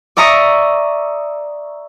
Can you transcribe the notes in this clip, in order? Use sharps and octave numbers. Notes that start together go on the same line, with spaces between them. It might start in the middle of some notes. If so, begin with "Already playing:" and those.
D5 E5 A#5 C#6 D#6